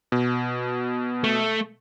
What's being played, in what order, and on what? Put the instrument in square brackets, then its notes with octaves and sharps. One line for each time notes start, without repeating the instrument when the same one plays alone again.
[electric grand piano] B2
[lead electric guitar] A3